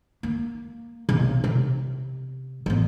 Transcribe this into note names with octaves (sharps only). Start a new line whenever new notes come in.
A#3
B1 C3
C3
A1 B3